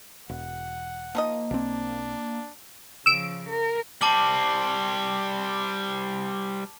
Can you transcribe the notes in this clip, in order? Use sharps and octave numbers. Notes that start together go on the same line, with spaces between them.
E1 F#5
F3 A#3 D#4 D#5
B1 C4 D4
C#3 F3 E6 D7
A#4
G3 C4 A5 D6 F#7